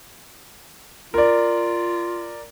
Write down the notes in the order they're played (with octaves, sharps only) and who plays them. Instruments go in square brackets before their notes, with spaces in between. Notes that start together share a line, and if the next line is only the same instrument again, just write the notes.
[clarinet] F4 [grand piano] A#4 D5